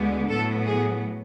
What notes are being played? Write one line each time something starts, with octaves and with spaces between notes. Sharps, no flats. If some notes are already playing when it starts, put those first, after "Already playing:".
Already playing: D2 D3 G#3 B3
A2 F#3 B3 A4
G#4